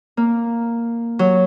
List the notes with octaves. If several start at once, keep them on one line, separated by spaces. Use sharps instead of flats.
A#3
F#3